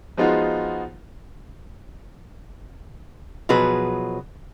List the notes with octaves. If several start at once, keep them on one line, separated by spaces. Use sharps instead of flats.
F3 G#3 B3 D#4 F4 F#4
B2 F3 F#3 G#4 B4